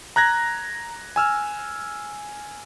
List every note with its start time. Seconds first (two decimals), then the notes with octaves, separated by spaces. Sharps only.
0.16 A#5 F#6 G#6 A#6
1.16 G#5 E6 F6